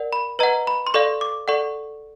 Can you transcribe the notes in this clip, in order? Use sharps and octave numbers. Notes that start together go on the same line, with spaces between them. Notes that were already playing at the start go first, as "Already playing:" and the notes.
Already playing: A#4 D5 F#5
B5
B4 D#5 F#5 A#5
B5
C6
A4 D5 F5 C#6
D6
A4 D5 F#5 C#6